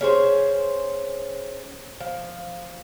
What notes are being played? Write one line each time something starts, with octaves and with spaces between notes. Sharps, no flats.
C#4 G#4 C5 C#5
F3